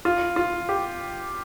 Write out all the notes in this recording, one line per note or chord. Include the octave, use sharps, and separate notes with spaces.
F4
F4
G4